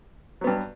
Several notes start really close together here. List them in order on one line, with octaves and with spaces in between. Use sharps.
F#3 B3 G2